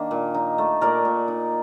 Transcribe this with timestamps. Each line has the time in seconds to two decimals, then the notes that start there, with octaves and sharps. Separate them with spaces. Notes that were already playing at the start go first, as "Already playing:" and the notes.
Already playing: D#3 A#3 D4
0.11 A#2
0.34 D#4
0.58 A3
0.81 A#2 A#4 D5
1.05 A#2
1.28 D#4